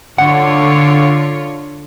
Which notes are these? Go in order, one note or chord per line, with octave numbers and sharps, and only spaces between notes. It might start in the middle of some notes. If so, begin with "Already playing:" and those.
D3 F4 C#5 F#5